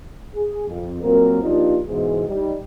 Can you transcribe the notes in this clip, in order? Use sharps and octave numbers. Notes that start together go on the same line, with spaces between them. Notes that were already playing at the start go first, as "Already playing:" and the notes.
G#4
F2
A#2 F#3 A#3 C4 A#4
F3 A#3 D4 D#4 F4 G4
E2 G#2 B2 E3 G#4 C5
G3 D#4